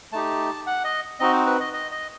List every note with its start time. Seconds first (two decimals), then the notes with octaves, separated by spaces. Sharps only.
0.12 A3 D#4 G4 A5
0.67 F#5
0.84 D#5
1.20 C4 D#4 F#4 D#5
1.33 C5
1.47 B4
1.60 D#5
1.73 D#5
1.91 D#5